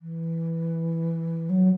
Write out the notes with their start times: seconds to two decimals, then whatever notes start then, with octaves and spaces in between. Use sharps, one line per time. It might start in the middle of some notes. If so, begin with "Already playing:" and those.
0.02 E3
1.49 F#3